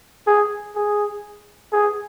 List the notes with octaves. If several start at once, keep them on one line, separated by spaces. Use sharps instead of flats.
G#4
G#4
G#4